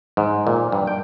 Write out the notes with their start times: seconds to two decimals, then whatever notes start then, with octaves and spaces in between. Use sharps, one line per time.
0.17 G#2
0.47 A#2
0.72 G2
0.87 G5